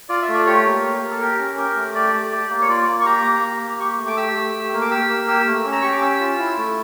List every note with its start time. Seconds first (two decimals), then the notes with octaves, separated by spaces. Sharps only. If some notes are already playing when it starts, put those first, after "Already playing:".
0.09 F4 D5
0.22 E5
0.28 A3
0.34 D5
0.46 G4 C#5
0.65 A#3
0.84 G4
1.03 A#3
1.11 A4
1.21 G4 A#4
1.39 C#4
1.57 G4 A#4
1.77 A3
1.95 G4 D5
2.13 A3
2.32 G4
2.50 A#3
2.62 C#5
2.69 F4 D5
2.87 A#3
3.01 C#6
3.05 G4 A#5
3.24 A#3
3.43 G4
3.61 A#3
3.80 G4 C#6
3.98 A3
4.08 D6
4.17 G4 E6
4.35 A3
4.54 G4
4.73 A#3
4.81 D6
4.91 G4 E6
5.09 A#3
5.28 G4 E6
5.47 A3
5.65 C#4
5.72 A#5
5.82 G4 C#6
5.92 D6
6.02 C#4 E6
6.21 F4
6.38 E4
6.57 A3